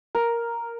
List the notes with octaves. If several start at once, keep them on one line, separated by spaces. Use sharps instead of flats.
A#4